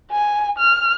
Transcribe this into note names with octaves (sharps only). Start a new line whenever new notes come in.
G#5
F6